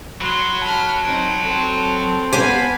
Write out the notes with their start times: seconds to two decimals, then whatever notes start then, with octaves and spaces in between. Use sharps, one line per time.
0.21 F#3 B5 C6 F#6 G7
0.62 A5 B5 F6
1.05 C4 D#4 D7
1.41 C4 A4
2.33 B3 C5 F5 G#5 B5 D6 G#6 B6